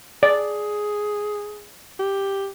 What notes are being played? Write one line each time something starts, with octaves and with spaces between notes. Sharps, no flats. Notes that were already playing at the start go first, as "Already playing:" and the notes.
G#4 D5
G4